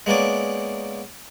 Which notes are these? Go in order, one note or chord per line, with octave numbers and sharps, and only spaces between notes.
G#3 A#3 B3 C#4 D5